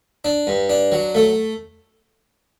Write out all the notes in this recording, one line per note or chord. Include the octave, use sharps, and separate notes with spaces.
D4
G2
D4
F#3
A3